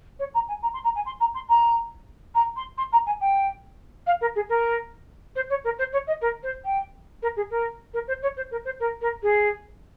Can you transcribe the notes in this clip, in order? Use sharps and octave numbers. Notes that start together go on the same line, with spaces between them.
C#5
A#5
G#5
A#5
C6
A#5
G#5
C6
A#5
C6
A#5
A#5
C6
C6
A#5
G#5
G5
F5
A#4
G#4
A#4
C5
C#5
A#4
C5
C#5
D#5
A#4
C5
G5
A#4
G#4
A#4
A#4
C5
C#5
C5
A#4
C5
A#4
A#4
G#4